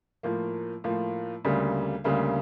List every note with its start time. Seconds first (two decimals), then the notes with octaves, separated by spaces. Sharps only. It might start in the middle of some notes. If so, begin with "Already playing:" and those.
0.23 A2 F3 A#3
0.84 A2 F3 A#3
1.44 D2 C#3 G3 A#3
2.04 D2 C#3 G3 A#3